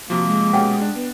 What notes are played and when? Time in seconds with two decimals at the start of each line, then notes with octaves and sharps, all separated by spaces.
0.10 C3 F3 A#3 F#4
0.25 G#3
0.53 B2 C#4 G4 F#5 G5
0.82 D4
0.95 B3